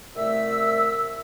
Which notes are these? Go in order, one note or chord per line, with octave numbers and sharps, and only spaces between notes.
C2 A3 E5 E6